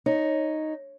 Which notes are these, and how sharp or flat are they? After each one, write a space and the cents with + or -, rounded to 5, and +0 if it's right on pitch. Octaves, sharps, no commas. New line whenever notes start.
D#4 +0 C#5 -5